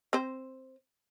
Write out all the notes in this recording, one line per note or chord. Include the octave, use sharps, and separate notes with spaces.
C4 C5